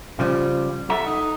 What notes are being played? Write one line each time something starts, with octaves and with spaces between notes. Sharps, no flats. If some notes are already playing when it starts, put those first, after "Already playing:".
C#3 F3 G3
A4 E5 F#5 A#5
D#4